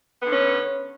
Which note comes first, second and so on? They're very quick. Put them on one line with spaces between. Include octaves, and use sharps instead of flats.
B3 D3 C#4